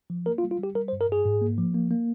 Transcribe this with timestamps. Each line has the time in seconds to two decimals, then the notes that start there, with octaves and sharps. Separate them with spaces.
0.10 F3
0.26 A#3 A#4
0.38 F4
0.43 G3
0.51 F4
0.59 G3 G4
0.75 G3 A#4
0.88 C5
0.93 G2
1.01 A#4
1.09 G2 G#4
1.25 G#2
1.42 A#3
1.58 F3
1.74 A#3
1.91 A#3